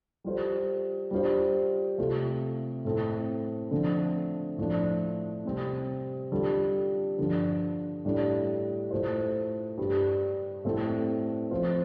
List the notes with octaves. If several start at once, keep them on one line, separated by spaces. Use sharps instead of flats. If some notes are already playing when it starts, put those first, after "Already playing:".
G3 F4 A4 C5
G3 D4 F4 C5
C3 A3 C4 F4 A4
A2 A3 C4 A4
D3 F3 A3 C4
A2 F3 A3 D4
C3 G3 C4
D3 G3 F4 A4
G2 D3 F3 D4
A2 G3 D4
A2 A3 F4 A4 C5
G2 G3 D4 G4
A2 A3 C4 A4
F3 C4 F4 C5